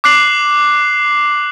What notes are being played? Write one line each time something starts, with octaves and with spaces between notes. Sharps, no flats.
D6 F#6 C7 F#7